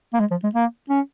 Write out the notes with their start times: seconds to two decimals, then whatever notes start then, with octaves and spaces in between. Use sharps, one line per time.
0.13 A#3
0.20 G#3
0.31 F3
0.43 G#3
0.55 A#3
0.90 C#4